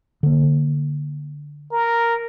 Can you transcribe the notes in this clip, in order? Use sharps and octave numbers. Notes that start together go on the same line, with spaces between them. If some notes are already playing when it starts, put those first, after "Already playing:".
D3 A#3
A#4